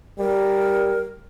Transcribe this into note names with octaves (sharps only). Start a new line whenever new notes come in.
G3 A#4